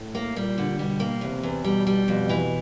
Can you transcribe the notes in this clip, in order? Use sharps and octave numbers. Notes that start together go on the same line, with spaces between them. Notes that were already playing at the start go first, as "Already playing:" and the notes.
Already playing: A2
A#3
A#2 G3
D3
B2 G3
A#3
E2 C3
E2
B2 G3
G3
F2 B2
E3